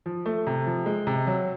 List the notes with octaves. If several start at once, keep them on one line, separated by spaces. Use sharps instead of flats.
F3
A3
C3
F3
G#3
C3
F#3